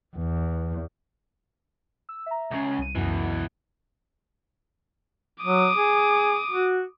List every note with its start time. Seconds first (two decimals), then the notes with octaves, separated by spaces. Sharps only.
0.17 E2
2.09 E6
2.26 E5 A#5
2.51 C#2 C#3
2.78 C2 D#7
2.95 C#2 F#2 B2 E3
5.43 F#3 D6 D#6
5.76 G#4
6.51 F#4